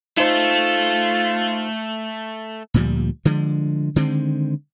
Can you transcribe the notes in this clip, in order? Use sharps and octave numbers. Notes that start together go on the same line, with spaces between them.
A3 D#4 F4 A4 C5
D2 A#2 F3 G3
D3 F3 G#3
D3 D#3 G#3 C4